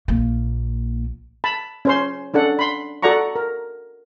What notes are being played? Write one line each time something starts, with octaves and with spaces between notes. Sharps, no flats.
A#1 A#3
A5 B5
C#4 C5 C6
C#4 D4 A4 F#5
B5 C6
F#4 A4 D5 F#5 A#5 C#6
A#4